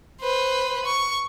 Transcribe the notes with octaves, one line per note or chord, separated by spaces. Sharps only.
B4 C5
C#6